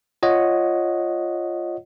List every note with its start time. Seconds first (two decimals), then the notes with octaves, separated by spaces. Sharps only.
0.23 F4 C#5 D#5 F#5